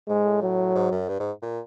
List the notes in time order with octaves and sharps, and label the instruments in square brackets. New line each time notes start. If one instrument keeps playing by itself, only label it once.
[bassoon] G#2 [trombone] G#3
[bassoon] A2
[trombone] F#3
[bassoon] G#2
F#2
G2
G#2
A#2